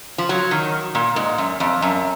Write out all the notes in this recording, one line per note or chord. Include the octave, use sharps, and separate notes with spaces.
F3
F#3
D#3
A#2
G#2
F#2
F2
F#2